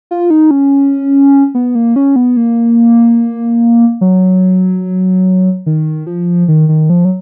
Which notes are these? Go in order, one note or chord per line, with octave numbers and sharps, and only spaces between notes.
F4
D#4
C#4
B3
A#3
C#4
B3
A#3
F#3
D#3
F3
D#3
D#3
F3
F#3